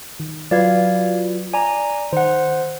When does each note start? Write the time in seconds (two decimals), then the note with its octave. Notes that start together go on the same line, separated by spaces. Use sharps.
0.20 D#3
0.51 F#3 F4 B4 D5 F5 G#6
1.53 D5 G#5 A#5
2.13 D#3 C5 F#5